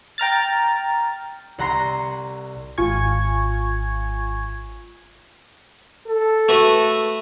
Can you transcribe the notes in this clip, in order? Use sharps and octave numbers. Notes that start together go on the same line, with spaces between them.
G5 A#5 F6 A6
C2 F#5 A#5 C6 A#6
G#1 F4 G#5 C#6 G#6
A4
A3 F#4 B4